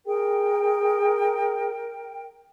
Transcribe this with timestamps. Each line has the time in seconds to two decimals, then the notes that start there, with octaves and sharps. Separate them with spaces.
0.06 G#4 A#4 G5